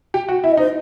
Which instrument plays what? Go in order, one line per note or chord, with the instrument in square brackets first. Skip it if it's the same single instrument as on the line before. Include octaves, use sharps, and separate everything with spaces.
[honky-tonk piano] G4
F#4
[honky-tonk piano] E4 [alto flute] E5
[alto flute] D#5
[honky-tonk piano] D#4 [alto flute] C5